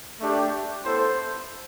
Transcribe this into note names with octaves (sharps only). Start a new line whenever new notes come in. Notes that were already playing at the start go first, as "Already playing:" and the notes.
A3 D4 G4
B3 E4 A4 C5